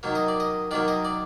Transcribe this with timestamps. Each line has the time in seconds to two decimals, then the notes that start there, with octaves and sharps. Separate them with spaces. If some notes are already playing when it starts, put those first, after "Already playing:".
0.03 D#3 F#3 A#3
0.15 D#5
0.28 D5
0.40 D#5
0.71 D#3 F#3 A#3 D5
0.88 D#5
1.05 D5